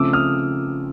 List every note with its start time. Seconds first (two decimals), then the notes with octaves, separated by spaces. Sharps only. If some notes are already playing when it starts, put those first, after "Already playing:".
Already playing: C#3 F3 A3 C4 D6 E6
0.13 D#6 F6